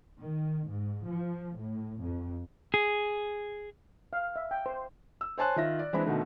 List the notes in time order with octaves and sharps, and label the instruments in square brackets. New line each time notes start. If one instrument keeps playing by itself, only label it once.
[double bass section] D#3
G#2
F3
A2
F2
[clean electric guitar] G#4
[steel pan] F5
E5
G5
C5
[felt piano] E6
C5 C#5 G#5 A5 C6 F#6
D#3 F4 E5 A#6
D5
E3 G#3 C4 D4 E4 B5
B2 D3 D#3 A3